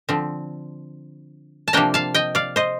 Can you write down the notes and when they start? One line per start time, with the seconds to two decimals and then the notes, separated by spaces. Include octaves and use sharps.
0.09 D3 F3 C4
1.68 A5
1.73 C3 F3 A#3 D4 G5 A#5
1.94 F5 A5
2.14 D#5 G5
2.35 D5 F5
2.56 C5 D#5